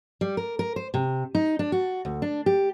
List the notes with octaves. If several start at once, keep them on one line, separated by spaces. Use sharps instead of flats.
G3
A#4
A#4
C5
C3
D#4
D4
F#4
D2
D4
G4